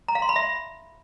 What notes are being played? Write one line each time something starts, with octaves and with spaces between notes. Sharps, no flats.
A#5
F5
C6
B5
E5